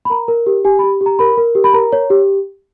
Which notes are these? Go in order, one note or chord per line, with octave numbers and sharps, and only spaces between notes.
B5
A#4 A#5
A#4
G4
G4 G#5
B5
G4
G4
A#5
A#4 B5
A#4
G4
B5
A#4 A#5
C#5
G4